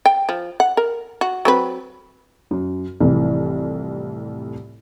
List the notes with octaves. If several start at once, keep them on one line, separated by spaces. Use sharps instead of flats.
G5
F3
F#5
A#4
F#4
F#3 C4 B4
F#2
C2 F2 A2 E3